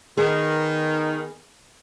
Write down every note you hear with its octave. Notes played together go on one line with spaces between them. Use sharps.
D#3 B3 G#4 A#4